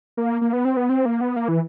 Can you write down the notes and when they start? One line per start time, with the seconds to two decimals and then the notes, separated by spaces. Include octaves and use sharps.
0.17 A#3
0.41 A#3
0.53 B3
0.65 C4
0.77 B3
0.89 C4
1.05 A#3
1.21 B3
1.36 A#3
1.48 E3